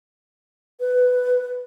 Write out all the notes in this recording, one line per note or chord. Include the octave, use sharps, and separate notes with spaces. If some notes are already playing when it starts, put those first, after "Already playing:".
B4